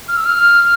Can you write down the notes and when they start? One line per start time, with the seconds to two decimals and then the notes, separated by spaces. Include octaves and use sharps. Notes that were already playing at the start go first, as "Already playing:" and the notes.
0.08 F6
0.17 E6
0.26 F6